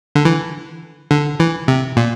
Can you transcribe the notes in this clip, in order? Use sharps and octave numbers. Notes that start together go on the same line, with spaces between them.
D3
E3
D3
E3
C3
A#2